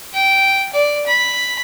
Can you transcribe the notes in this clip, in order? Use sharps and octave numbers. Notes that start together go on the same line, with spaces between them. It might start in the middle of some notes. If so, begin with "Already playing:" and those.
G5
D5
B5